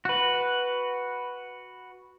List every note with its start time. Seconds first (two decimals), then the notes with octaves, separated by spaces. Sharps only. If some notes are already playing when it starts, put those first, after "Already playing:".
0.05 F#4 B4